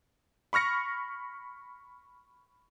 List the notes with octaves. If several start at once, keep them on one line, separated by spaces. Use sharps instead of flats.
B5 C#6 F6 A#6 C#7